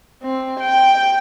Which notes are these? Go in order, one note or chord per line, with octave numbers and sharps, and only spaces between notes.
C4
G5